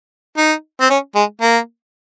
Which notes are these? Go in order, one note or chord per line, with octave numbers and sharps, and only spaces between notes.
D#4
C4
C#4
G#3
A#3